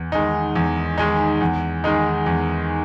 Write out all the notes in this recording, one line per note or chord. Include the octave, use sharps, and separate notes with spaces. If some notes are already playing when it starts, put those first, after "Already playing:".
Already playing: E2
D#3 G#3 D#4
E2
D#3 G#3 D#4
E2
D#3 G#3 D#4
E2